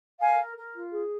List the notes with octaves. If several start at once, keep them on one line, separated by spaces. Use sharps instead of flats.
A#4 F5 G#5
A#4
A#4
F4
G#4